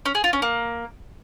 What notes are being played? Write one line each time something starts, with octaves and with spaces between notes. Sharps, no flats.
C#4
G#4
F4
C#4
A#3